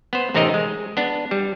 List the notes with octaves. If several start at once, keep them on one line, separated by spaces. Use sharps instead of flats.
B3 C5
A1 C3 C4 D#4 A#4 D#5
G#3
B3 D4
G3